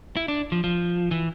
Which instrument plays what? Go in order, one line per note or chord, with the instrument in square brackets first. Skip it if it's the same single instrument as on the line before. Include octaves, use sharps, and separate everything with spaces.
[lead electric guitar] E4
D4
F3
F3
E3